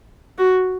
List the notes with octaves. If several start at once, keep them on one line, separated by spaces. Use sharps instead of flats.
F#4